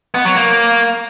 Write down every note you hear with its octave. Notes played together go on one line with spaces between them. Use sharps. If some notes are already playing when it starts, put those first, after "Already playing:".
B3
F#3
A#3